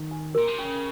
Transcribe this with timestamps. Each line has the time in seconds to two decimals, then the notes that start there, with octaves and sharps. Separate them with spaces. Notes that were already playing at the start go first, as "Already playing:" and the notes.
Already playing: D#3
0.11 G#5
0.35 A#2 A#4
0.48 C3
0.59 C#3 C#4